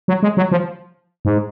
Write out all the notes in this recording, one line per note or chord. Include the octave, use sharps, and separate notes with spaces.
F#3
G#3
F#3
F3
G#2